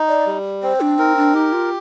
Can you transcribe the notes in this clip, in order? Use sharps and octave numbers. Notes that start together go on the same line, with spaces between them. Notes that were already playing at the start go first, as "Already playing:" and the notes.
Already playing: D#4
D5
G3
C4 C5
D4
D#4 A#4
D4
D#4 G4
F4